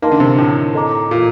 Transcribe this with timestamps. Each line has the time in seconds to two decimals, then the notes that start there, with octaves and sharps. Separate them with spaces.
0.02 A#3 D#4 A#4 D#5 A5 C6
0.12 D3
0.20 C3
0.38 A2
0.74 A4 D#5 A#5 D6
1.11 A#2